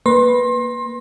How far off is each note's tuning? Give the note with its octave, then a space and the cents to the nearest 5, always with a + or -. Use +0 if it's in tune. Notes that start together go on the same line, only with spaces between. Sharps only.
A#3 +0 B4 +0 C6 +30